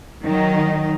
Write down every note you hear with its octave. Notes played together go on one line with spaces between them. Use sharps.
D#3 F#3 D#4